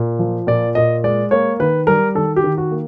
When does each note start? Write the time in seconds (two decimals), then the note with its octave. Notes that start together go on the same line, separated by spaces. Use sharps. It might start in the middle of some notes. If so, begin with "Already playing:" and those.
Already playing: A#2
0.19 F3
0.47 A#2 D5
0.75 A#2 D#5
1.04 G#3 D5
1.31 A#3 C#5
1.60 D#3 B4
1.87 G3 A#4
2.15 D#3 A4
2.36 G4
2.44 D#3
2.58 F#4
2.71 A#3